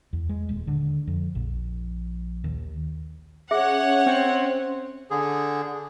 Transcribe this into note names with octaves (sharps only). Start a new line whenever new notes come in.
E2
G#3
D#1
D3
F2
A#1
D#2
C#4 G#4 C#5 E5 F#5
C4
D3 G#4